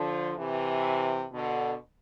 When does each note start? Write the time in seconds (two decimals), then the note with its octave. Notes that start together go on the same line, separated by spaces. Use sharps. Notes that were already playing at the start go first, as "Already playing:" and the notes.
Already playing: D3 F3
0.38 C3 E3
1.31 B2 D3